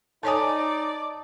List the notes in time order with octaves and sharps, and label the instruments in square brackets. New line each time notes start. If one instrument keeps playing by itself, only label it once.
[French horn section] D#4 [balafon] A4 C#5 G#5 [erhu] D5 [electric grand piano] A5 D#6